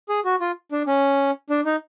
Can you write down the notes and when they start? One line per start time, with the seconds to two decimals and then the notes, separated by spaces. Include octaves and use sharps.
0.09 G#4
0.25 F#4
0.40 F4
0.72 D4
0.87 C#4
1.50 D4
1.65 D#4